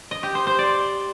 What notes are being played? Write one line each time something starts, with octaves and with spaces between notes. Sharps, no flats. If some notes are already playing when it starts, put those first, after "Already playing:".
D#5
G4
C5
C5
D5